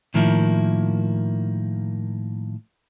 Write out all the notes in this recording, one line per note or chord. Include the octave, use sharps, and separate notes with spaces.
A2 D#3 F3 A#3 E4